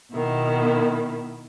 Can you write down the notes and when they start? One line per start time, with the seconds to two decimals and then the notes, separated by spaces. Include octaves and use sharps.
0.12 B2 D#3 E4